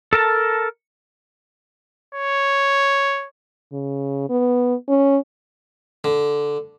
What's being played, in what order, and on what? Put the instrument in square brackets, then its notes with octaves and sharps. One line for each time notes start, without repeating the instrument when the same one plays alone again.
[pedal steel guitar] A4 A#4 A5
[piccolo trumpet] C#5
[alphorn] C#3
B3
C#4
[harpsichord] D3